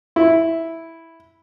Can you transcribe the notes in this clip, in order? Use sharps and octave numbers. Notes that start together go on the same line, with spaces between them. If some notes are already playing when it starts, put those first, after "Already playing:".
E4